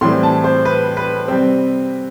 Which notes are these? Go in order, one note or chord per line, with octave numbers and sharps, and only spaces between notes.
A2 E3 G3 C4 C6
A5
C5
B4
B4
C3 G3 C4